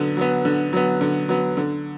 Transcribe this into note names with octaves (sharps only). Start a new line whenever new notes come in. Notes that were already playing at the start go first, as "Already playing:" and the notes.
Already playing: D3 F#3 B3
F#3 B3
D3
F#3 B3
D3
F#3 B3
D3